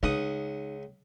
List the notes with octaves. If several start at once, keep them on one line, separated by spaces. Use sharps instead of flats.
C#2 D#4 F#5 D#6